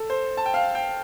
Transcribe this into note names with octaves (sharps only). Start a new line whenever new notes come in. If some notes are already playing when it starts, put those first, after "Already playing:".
Already playing: A4
C5
A5
G5
F5
G5